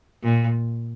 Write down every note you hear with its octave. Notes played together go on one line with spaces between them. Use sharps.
A#2